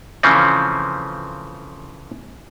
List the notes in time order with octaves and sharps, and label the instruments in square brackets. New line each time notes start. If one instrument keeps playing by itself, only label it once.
[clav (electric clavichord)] C#3 E3 F3 A3 C4 C#4